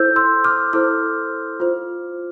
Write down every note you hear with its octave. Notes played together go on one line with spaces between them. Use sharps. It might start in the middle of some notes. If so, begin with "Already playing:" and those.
Already playing: E4 A4 C5 E6 G6
C6 E6
D6 F6
E4 A4 C5 D6 F6
F4 C5